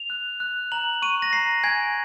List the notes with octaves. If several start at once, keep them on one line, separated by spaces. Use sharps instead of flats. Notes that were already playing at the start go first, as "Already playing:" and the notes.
Already playing: F7
F#6
F#6
A#5 F#7
C#6 D#7
A#6
A#5 C7
G#5 G#6